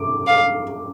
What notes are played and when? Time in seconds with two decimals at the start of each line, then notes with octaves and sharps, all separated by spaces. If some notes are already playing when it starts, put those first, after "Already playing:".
Already playing: D6
0.27 F5